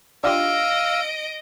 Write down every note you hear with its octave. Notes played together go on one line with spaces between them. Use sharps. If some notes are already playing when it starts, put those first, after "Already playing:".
D4 F4 G4 D#5 F5 E6 D7